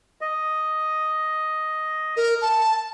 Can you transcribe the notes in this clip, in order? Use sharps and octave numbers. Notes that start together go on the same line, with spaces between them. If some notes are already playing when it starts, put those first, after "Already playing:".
D#5
A#4
A5